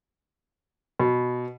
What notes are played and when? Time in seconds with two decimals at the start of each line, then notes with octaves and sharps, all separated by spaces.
1.00 B2